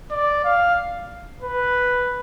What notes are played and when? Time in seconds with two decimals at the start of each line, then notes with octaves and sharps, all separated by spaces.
0.11 D5
0.45 F5
1.42 B4